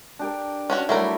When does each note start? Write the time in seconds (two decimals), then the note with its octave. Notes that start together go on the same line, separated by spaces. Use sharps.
0.19 D4 G4 A#4
0.70 C#4 D4 F#4
0.89 F#3 G3 A3 E4 F4 A#4